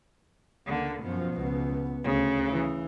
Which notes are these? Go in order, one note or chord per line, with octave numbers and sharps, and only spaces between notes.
C#2 D3 A#3
F#2 B2 F3
C#2 B3
D2 C#3
E3